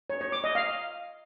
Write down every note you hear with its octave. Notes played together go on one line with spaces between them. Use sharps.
C#5
C#5
D6
D#5
F5